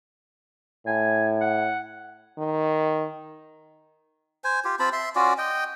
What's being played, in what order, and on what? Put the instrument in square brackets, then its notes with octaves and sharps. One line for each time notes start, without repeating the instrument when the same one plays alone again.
[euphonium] A2 [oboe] G#5
[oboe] F#5
[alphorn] D#3
[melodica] C5 G#5
F4 G4
C4 F4 A5 B5
E5 C6
C#4 F4 F#4 D5
D#5 G5